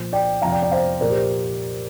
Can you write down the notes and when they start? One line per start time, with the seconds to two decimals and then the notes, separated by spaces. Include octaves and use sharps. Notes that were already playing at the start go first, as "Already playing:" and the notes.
Already playing: A#2 F3 C5
0.13 D5 G5
0.42 F2 C3 F3 F5 A#5
0.52 D5 G5
0.62 D5 G5
0.72 C5 F5
1.01 A#2 F3 A#4 D5
1.10 G4 C5